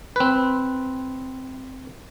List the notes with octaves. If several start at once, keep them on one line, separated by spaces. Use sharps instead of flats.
C4 B4